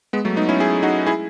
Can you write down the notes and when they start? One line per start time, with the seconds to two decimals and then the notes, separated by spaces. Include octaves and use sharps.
0.13 G#3 B3
0.25 F#3 A3
0.36 B3 D#4
0.49 C#4 E4
0.60 E4 G#4
0.83 D#4 F#4
1.06 E4 G#4